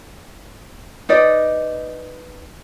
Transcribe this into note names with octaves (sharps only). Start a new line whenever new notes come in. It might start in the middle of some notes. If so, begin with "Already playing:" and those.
D#4 B4 D5 D#5